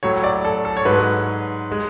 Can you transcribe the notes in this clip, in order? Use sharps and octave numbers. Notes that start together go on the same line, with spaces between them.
A2 F#3 C#5
D5
A4
A4
C#5
G#2 F#3 B4
G#3